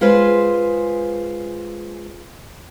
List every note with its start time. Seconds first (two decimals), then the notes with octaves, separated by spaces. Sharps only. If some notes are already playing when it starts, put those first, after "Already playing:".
0.01 G#3 F4 G#4 B4 C5